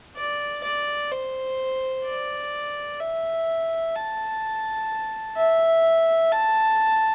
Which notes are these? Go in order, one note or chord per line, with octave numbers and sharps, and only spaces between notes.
D5
D5
C5
D5
E5
A5
E5
A5